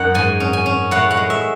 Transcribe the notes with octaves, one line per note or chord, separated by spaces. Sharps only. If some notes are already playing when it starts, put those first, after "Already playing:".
Already playing: F#2 D#4 F#5
G#2 G#5
C#4
G#5
C#4
A2 F#5
F#5
G#3
E5